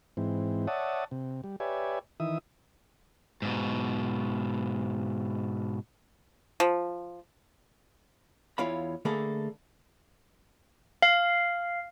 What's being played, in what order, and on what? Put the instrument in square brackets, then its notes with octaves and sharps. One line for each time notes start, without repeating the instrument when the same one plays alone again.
[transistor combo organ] G#2 E3 C4
C#5 D5 E5 F#5 A5 D#6
C3
G3
G4 B4 C#5 D5 E5 G#5
D#3 E3 E5 D#6
[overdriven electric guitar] G#2 B2
[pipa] F3
[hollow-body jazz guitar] E2 E4 F4 C#5 F5 B5
D3 A3 A#3 G#4 A4 B5
[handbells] F5